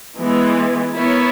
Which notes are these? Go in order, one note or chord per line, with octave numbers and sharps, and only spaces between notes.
E3 G#3 B3
B3 E4 A#4 C#5